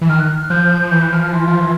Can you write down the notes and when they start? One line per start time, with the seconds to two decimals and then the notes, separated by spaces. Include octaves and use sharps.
0.01 E3
0.09 D#3 F6
0.20 F#6
0.40 F6
0.50 F3 G6
0.82 F3
0.91 E3 G6
1.02 F#6
1.12 F3 F6
1.22 F6
1.32 E3 C6
1.47 F3
1.60 E3